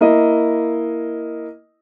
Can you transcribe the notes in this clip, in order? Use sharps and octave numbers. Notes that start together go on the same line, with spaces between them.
A#3 E4 D#5